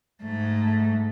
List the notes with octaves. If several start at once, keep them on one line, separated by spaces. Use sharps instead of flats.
G#2 A3